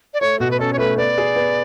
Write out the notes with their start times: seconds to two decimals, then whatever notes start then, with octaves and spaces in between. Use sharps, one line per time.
0.14 D5
0.21 A3 C#5
0.40 B2 F#4
0.51 B4
0.59 C#4 A4
0.73 C#5
0.78 A3 B4
0.97 B3 D5
1.18 G#4
1.36 B3